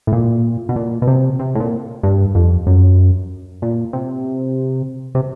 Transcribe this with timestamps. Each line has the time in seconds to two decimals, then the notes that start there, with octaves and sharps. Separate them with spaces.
0.07 A2
0.12 A#2
0.69 B2
0.76 A#2
1.02 B2
1.07 C3
1.39 C3
1.55 A2
1.60 A#2
2.03 G2
2.35 F2
2.67 F#2
3.62 A#2
3.93 C3
5.15 C3